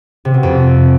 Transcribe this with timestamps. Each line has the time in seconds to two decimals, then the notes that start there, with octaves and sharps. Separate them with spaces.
0.25 C3
0.34 B2
0.43 F2